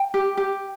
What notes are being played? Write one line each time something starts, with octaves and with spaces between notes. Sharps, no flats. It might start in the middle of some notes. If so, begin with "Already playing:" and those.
Already playing: G5
G4
G4